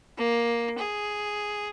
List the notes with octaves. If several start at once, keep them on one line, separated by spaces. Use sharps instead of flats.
A#3
G#4